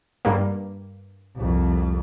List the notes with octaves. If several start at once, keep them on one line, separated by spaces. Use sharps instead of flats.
G2 G3 A#3
C2 F2